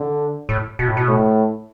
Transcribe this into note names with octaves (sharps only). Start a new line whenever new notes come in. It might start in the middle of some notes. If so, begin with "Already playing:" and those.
Already playing: D3
A2
B2
A2
B2
A2